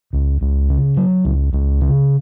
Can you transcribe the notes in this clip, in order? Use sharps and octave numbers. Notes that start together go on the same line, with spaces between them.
C#2
C#2
C#3
F#3
C#2
C#2
C#3